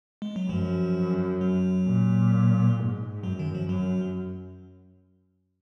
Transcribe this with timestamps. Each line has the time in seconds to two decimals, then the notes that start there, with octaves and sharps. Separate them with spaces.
0.22 G#3
0.36 F#3
0.50 F#2 F3
1.41 F#3
1.87 A#2
2.79 G#2
3.23 F#2 F#3
3.39 D#3
3.55 F3
3.69 F#2 F#3